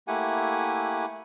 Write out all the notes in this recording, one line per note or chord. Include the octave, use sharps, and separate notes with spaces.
A3 A#3 E4 G4 F#5 G#5